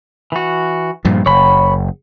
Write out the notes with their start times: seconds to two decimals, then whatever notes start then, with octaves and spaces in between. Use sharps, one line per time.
0.32 E3 F#4
1.05 G2 A#2 F3
1.26 F#1 C#5 B5